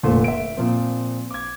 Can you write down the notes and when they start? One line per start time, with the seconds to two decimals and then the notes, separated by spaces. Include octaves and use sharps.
0.03 F1 A#2 D3 A3 F4 C5
0.24 E5 D7
0.57 A#2 F3 C4
1.31 D6 G#6